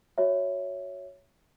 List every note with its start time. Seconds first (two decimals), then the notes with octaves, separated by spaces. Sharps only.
0.18 F#4 C#5 E5